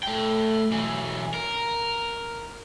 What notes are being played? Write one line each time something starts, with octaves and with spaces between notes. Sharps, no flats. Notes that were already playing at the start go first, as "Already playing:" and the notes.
A3 G5
B1 E3
A#4